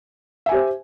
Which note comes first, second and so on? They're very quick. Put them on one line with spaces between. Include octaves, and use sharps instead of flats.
E5 G#5 G4 C5